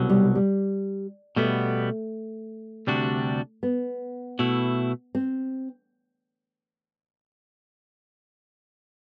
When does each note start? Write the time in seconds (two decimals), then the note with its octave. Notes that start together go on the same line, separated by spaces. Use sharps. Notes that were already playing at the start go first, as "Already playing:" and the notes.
Already playing: C2 B2 F#3
0.10 G3
0.35 G3
1.36 B2 G3 A3 B3
2.87 D2 C3 G3 D4 F#4
3.63 B3
4.39 B2 A3 E4
5.15 C4